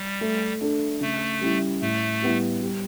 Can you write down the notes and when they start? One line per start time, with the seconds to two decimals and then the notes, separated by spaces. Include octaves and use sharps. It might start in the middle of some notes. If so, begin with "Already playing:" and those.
Already playing: G3
0.21 A3
0.61 D4 A4
1.01 C#3 A3
1.41 G3 C#4 E4
1.81 A2 A3
2.22 G3 B3 E4
2.61 G3